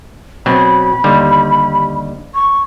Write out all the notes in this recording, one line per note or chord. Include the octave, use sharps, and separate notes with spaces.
B2 F#3 C4 B5
D#2 D3 G3
C#6